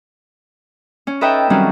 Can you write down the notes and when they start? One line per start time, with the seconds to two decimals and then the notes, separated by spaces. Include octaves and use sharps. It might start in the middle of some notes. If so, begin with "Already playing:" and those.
1.07 C#4
1.21 D#4 A4 B4 D#5 E5 G5
1.50 D#3 F#3 G3 C4 C#4